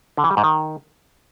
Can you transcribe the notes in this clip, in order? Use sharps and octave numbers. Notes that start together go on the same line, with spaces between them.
D3
E3
G3
G#2
D#3